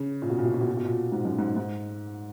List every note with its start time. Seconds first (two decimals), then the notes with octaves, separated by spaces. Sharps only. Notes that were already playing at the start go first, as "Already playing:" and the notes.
Already playing: C#3
0.22 A#2
0.30 B2
0.38 A#2
0.45 B2
0.54 A#2
0.61 B2
0.69 A#2
0.77 B2
0.85 A#2
1.12 G#2
1.25 F#2
1.39 G#2
1.57 G#2